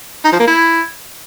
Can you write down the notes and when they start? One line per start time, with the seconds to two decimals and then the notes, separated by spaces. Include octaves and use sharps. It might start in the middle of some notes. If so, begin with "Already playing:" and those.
0.25 D#4
0.32 F3
0.40 A#3
0.47 E4